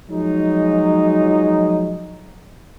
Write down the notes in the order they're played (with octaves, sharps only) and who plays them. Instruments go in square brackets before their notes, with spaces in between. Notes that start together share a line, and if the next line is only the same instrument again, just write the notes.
[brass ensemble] F3 F#3 G#3 D#4